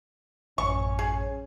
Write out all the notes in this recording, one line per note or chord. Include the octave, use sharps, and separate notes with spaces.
A1 F#2 C#4 C#6
G#4